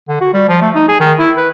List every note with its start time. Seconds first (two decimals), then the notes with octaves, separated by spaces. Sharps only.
0.08 D3
0.21 F#4
0.34 G3
0.49 F3
0.61 A3
0.75 D#4
0.88 G#4
1.00 D#3
1.19 E4
1.37 B4